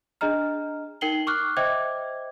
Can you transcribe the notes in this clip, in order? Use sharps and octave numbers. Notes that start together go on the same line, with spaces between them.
D4 G#4 D#5 A#5 F6
D#4 A#4 G5 C7 F#7 G7
C#6 D6 F6 F#6
C5 D#5 E5 G5 D6 G#6